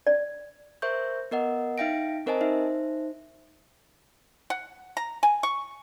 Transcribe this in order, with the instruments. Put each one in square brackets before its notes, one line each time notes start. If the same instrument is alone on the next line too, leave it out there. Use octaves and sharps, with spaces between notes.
[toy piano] D5
[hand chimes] A#4 C5 E5 C#6 G6
B3 A#4 D#5 F#5
D#4 E5 F5 G5 A#6 D7
C4 A#4 C5 D#5 G#5 A5
D#4 C5 E5
[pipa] F#5
A#5
G#5
C#6